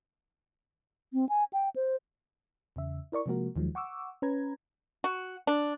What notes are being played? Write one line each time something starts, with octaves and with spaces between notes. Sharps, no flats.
C4
G#5
G5
C5
E2 C#3 E5
E4 A#4 D5 C#6
C3 F3 G#3 A#3 F#4 A#4
D#2 D#3 F3 F#3 G#3
F#5 C#6 D6 E6
C#4 B4 A#5 G#6
F#4
D4